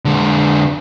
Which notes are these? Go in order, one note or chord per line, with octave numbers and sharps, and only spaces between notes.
D3 G#3